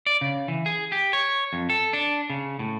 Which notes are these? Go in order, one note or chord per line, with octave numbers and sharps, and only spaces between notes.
D5
C#3
E3
G#4
G4
C#5
F2
A4
D4
C#3
A2